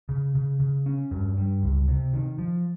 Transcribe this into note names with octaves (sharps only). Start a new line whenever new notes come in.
C#3
C#3
C#3
C#4
G2
G3
C#2
C3
D#3
F3